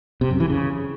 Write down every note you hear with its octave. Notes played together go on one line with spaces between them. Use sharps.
C3
F#2
E3
C#3